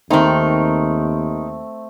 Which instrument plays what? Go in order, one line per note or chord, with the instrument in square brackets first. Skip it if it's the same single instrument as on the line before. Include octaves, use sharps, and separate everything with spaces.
[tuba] D#2 [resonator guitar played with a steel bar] D#3 D#4 [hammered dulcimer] A3 C4